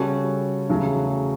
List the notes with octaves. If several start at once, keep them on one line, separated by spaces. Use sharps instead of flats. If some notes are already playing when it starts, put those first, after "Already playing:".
Already playing: C#3 G3 C#4 F#4 A4
E2 C#3 F#3 A3